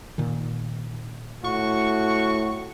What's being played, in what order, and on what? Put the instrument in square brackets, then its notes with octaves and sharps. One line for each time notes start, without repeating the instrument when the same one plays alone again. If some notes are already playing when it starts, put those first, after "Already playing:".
[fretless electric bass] A#2 D#3
[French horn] A2 [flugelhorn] F#4 [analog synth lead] C#6